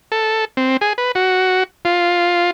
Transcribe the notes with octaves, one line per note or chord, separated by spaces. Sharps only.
A4
C4
G#4
B4
F#4
F4